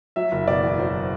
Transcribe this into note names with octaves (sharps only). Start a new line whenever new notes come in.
F#3 E5
F#1
B2 D5
E2
F#3 C5